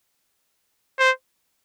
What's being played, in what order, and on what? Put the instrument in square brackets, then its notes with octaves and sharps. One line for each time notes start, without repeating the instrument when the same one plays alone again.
[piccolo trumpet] C5